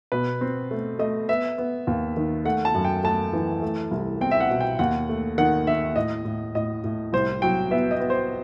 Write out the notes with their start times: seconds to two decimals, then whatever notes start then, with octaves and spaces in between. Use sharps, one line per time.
0.12 B2 B4
0.41 C4
0.71 A3
0.99 A3 D#5
1.29 B3 E5
1.58 B3
1.87 D#2
2.17 D#3
2.45 A3 F#5
2.65 A5
2.74 F#2
2.85 G5
3.03 A3 A5
3.33 E3
3.62 A3
3.91 C2
4.21 C4 G5
4.31 E5
4.40 F#5
4.50 B2
4.60 G5
4.79 D#2 F#5
5.09 A3
5.38 D#3 F#5
5.67 D#3 E5
5.96 A2 D#5
6.25 A2
6.55 A2 D#5
6.84 A2
7.13 C2 C5
7.42 F#3 G5
7.71 B3 E5
7.91 D#5
8.00 B3
8.10 C5